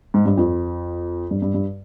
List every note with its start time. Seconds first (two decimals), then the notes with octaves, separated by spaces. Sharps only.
0.14 G#2
0.26 G2
0.37 F2
1.31 G2
1.42 G2
1.54 G2